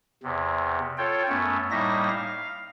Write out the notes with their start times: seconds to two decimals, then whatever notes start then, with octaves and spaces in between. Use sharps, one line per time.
0.23 E2 C3
0.98 F4 A4 C#5 G5
1.29 F#2 A3 B3 C#4
1.71 A2 G3 A#3 D#4 E5 A#6
2.10 F5